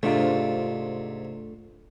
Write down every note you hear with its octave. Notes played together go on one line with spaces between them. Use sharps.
G#2 C3 A3 D4 F4